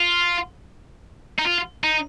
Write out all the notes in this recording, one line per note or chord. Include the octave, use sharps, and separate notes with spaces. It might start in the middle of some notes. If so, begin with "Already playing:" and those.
Already playing: F4
D#4
F4
D#4